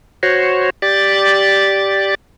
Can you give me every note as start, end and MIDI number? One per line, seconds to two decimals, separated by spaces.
0.23 0.70 66
0.23 0.70 72
0.23 0.70 73
0.82 2.15 67
0.82 2.15 74
0.82 2.15 93